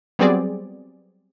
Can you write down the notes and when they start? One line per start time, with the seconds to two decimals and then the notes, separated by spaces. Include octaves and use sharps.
0.19 F#3 G3 B3 C4 G#4 D5